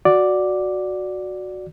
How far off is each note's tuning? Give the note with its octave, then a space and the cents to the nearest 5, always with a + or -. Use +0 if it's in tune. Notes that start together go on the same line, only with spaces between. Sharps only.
F#4 -5 D5 +0